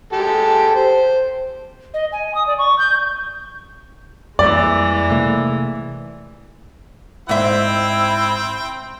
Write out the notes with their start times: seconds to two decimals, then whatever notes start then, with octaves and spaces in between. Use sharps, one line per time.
0.13 G#3 G4 A4
0.75 C5
1.94 D#5
2.12 G#5
2.35 D#6
2.46 D5
2.58 C#6
2.78 G6
4.39 F2 E3 G3 G#3 A#3 D5
5.10 C3 A3 A#3
7.29 G#2 C4 E4 E5 G5